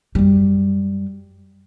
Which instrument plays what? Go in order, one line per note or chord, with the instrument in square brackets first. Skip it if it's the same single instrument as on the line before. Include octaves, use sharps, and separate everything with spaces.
[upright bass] F#2 G3